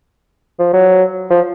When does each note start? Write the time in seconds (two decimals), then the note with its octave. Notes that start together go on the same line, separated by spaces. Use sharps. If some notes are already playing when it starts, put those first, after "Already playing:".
0.59 F3
0.73 F#3
1.30 F3